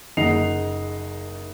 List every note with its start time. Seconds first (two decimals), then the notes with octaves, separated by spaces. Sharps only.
0.17 F#1 D#4 D#5 F#5 C7 F7